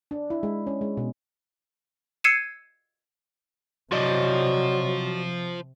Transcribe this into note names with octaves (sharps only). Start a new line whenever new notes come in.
D4
E4
G#3
C#4
G#3
B2
E6 G#6 C7 C#7 D#7 E7
C3 F3 F#3 F#4 D5 D#5